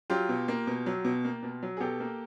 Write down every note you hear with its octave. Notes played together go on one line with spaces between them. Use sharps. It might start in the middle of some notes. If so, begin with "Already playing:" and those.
F#3 F4 G4
B2
A#3
B2
F#3
B2
A#3
B2
F#3
G#4
B2 G4 A4
A#3